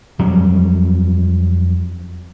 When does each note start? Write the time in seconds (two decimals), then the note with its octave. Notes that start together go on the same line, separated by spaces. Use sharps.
0.19 F2 F#3 G3